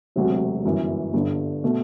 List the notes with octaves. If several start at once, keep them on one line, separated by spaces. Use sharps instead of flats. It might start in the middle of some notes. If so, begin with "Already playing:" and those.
E1 D2 C3 F#3
G1 F#2 E3
G1 G2 D3
B2 A3